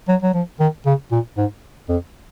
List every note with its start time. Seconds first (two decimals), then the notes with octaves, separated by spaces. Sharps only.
0.08 F#3
0.23 F#3
0.34 F3
0.60 D#3
0.86 C#3
1.12 A#2
1.38 G#2
1.89 F2